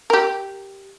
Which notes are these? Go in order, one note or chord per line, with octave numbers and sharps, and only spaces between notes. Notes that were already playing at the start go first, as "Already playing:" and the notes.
G4 A#4